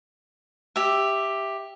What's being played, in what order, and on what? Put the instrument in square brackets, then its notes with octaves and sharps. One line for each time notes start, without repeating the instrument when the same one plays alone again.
[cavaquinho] G4 E5